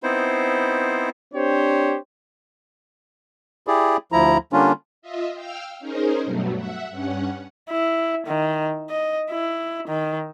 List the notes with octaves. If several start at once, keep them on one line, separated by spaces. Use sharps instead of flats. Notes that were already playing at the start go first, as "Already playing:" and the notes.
B3 C4 D#4 E4 C5
C4 D4 G4 C5 C#5
E4 G4 G#4 D5
D2 F3 E4 A#5
D3 G3 A#3 C#4 D4 F4
F4 D#5 E5
F5 G5 E6 F6
C#4 D#4 G#4 A#4 C5
G2 B2 F#3 A3
E5 F#5
G2 C#4 F#5
E4
D#3
D#5
E4
D#3